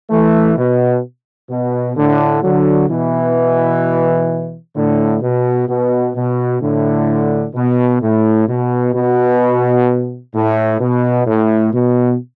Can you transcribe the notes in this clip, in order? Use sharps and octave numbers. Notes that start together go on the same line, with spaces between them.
E3 A3
B2
B2
A2 D3
D3 F#3
B2 E3
A2 D3
B2
B2
B2
A2 D3
B2
A2
B2
B2
A2
B2
A2
B2